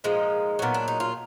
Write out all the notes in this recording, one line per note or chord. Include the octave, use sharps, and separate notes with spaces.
A#2 F3 G#3 D#4
A#2 F#3 B3
D4
D#4
F4